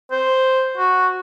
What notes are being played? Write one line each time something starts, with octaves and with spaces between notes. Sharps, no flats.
C5
F#4